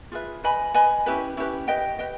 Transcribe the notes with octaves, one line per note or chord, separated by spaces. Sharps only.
F4 G#4 B4 E5
B4 D#5 G#5 B5
B4 D#5 G#5 B5
C#4 E4 G4 B4
C#4 E4 G4 B4
G4 B4 D#5 G5
G4 B4 D#5 G5